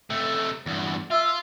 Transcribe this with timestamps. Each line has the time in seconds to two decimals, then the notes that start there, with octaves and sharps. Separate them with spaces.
0.10 C3 A3
0.66 E2 G2
1.11 F4 E5